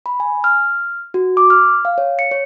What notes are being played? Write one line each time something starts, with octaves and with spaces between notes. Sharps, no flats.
B5
G#5
F6
F#4
D6
F6
F5
C#5
C#7
C#5